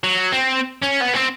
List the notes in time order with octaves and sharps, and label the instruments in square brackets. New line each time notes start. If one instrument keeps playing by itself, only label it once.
[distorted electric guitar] F#3
C4
C#4
B3
C4